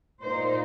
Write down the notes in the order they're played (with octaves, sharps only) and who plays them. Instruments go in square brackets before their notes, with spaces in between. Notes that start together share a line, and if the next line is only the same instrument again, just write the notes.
[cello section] A#2 A#3 D#4 C5